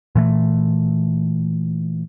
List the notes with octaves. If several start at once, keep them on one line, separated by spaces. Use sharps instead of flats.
A#2 E3 A3